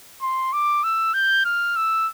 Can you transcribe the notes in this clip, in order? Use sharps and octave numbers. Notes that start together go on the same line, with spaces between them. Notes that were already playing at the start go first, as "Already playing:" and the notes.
C6
D6
E6
G6
F6
E6